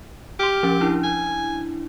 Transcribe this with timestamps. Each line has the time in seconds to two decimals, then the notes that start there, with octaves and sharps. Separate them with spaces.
0.40 G4 C6 F6
0.63 F3 C#4
0.81 D4 E4
1.03 G#5